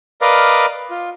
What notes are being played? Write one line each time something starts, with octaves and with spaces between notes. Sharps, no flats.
A#4 B4 D5 D#5 F5
F4